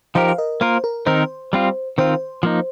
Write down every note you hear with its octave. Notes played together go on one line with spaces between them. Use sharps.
F3 D#4 G4 A#4 C5 F5
F5
A#4 D#5
A#3 F4 A#4 C5
A#4
D#3 C4 D#4 A#4 C5
G3 C4 F4
D#3 C4 F4 C5
F3 A#3 D#4